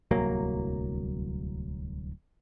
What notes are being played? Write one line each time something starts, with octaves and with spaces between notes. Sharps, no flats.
D1 C2 F#3 A#3